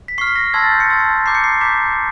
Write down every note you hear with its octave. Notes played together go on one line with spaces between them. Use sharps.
B6
C#6 F6 C7
B6
A#6
A5 C6 E6 G#6 A#6
A6
G6
C#7
A5 C6 E6
A#5 D6 G6 C7
C#7
C7
A#5 D6 G6 B6